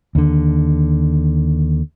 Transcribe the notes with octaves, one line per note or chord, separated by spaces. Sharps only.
D#2 D3